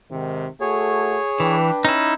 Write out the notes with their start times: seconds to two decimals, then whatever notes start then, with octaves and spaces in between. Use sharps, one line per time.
0.11 G#2 C3 D#3
0.61 A3 F#4 G#4 A4 C#5
1.40 E3 D4 B4 G5
1.85 C#4 D#4 E4